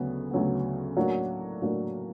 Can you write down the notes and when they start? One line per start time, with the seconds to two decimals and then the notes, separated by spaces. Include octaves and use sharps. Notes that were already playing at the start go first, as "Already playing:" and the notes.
Already playing: D2 C#3 F#3 B3
0.31 D2 C#3 F#3 B3
0.97 A2 F#3 A#3 D4 F#4
1.61 A2 F#3 A#3 D4 F#4